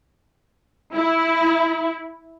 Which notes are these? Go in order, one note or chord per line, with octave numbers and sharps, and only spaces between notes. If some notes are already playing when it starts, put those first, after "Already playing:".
E4